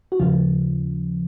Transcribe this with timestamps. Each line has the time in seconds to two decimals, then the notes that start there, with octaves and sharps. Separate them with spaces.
0.12 F#4
0.19 D#2 C#3 F3 F4